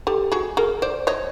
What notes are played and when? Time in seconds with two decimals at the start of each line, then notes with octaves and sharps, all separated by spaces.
0.07 G4 A4
0.32 F#4 G#4
0.57 G#4 A#4
0.82 C5 D5
1.07 C#5 D#5